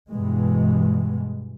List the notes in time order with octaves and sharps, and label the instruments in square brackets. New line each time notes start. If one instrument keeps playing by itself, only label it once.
[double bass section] G2 B2 E3 G#3